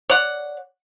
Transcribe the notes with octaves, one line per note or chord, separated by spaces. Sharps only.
C#5 D5 F#5